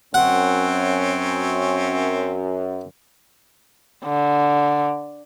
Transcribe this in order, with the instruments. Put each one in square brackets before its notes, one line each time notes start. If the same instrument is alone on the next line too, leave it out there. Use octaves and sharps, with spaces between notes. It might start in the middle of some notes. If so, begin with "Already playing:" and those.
[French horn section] F#2 [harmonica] C4 C#4 [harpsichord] F#5
[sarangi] D3